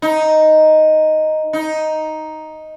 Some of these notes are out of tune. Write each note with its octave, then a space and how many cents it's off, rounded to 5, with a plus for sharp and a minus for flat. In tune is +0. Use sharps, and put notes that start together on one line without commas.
D#4 +0
D#4 +5